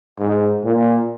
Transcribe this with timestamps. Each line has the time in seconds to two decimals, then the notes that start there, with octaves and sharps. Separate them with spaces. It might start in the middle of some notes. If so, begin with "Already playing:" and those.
0.19 G#2
0.64 A#2